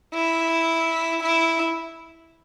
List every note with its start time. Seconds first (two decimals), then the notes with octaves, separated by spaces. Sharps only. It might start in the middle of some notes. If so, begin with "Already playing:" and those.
0.14 E4
1.23 E4